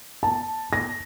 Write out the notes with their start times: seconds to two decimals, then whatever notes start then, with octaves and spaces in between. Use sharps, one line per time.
0.23 A5
0.73 A#6